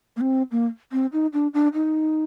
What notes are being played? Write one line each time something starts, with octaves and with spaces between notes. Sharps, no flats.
A#3
C4
A#3
C4
D#4
D4
D4
D#4